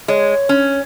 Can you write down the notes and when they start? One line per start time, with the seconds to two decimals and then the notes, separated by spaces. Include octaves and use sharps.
0.08 G#3 C#5
0.49 C#4